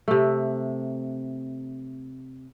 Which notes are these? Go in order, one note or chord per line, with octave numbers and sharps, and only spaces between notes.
C3 A3